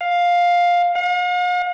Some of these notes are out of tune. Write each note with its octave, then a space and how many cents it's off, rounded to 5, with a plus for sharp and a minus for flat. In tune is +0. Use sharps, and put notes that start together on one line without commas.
F5 +10
F5 +45